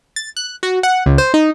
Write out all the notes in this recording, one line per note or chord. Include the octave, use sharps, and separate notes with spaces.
A6
F#6
F#4
F#5
C#2
C5
D#4